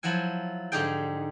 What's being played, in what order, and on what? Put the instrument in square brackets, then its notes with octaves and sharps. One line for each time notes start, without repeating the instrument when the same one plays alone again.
[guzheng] F3 F#3 E4 F#5 G#5
G#2 D3 D#4 G4 G#4 G5